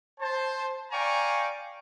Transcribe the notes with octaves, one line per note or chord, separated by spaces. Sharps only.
C5 A5
D5 F5 G5 G#5 A#5 C#6